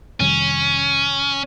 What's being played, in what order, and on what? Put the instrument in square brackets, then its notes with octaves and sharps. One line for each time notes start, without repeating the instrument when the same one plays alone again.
[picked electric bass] F2 C3 D#3 G3 [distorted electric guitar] C#4